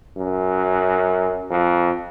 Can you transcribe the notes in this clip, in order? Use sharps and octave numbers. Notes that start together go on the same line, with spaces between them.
F#2
F2